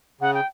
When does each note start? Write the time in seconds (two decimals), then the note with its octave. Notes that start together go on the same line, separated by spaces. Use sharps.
0.21 C#3 F#5
0.34 G5